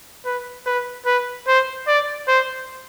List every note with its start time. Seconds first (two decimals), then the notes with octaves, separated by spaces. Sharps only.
0.25 B4
0.66 B4
1.06 B4
1.47 C5
1.88 D5
2.28 C5